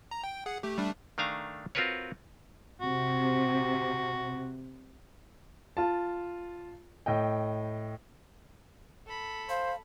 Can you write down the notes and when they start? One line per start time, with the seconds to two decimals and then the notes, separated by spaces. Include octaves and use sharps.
0.11 A#5
0.24 G5
0.46 G#4 F#5
0.63 A3 G4
0.78 G3 A3 D4
1.18 D#3 A3 D4 F5 G#5 A#5
1.75 C4 F4 F#4 A#4 B4 C#5
2.81 C3 F#4
5.77 F4 A5
7.06 A2 D#5 G5
9.06 A4 B5
9.49 C5 F5